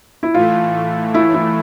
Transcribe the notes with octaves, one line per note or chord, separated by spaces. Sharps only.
E4
A2 E3 A3 F4
E4
E4